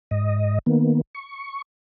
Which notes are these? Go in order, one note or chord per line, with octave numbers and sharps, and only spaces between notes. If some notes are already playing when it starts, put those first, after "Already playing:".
G#2 D#5
D#3 A#3 B3
C#6